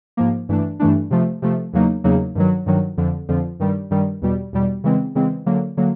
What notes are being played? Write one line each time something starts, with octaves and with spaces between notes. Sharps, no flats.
G#2 F3 A#3
G2 E3 A3 D4
G2 E3 A3 D4
C3 F3 A3
C3 F3 A3
E2 C#3 F#3 A#3 D#4
E2 C#3 F#3 A#3 D#4
G2 D#3 F#3
G2 D#3 F#3
F2 D3 F3
F2 D3 F3
G2 D#3 G3
G2 D#3 G3
E2 B2 G3
E2 B2 G3
C#3 E3 G#3 C4
C#3 E3 G#3 C4
D3 F#3 A#3
D3 F#3 A#3